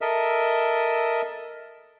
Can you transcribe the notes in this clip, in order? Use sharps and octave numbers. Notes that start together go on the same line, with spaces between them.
A4 A#4 D#5 E5